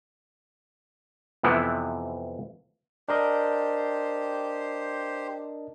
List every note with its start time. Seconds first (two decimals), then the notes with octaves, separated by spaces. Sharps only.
1.43 F2 C3 E3 B3 E4
3.08 D4 G4 A#4 C5 D#5